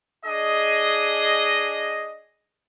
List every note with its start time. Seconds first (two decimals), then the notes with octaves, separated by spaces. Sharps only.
0.25 D4 G#4 D#5